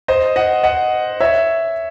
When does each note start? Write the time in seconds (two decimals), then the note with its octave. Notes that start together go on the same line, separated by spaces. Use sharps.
0.08 C5 D#5
0.36 D#5 F#5
0.64 D#5 F#5
1.20 C#5 E5